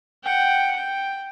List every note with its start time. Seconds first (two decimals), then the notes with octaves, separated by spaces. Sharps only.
0.24 F#5 G5
0.76 G5